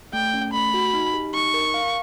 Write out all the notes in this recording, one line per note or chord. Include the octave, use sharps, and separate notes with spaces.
A3 G5
C#4
A3 B5
F#4
D#4
G4
D#4 C#6
A#4
F5